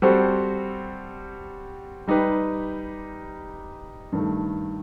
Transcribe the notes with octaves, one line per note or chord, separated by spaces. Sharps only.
G3 C4 F#4 A4 C5
G3 D#4 G4 B4
G2 D#3 A3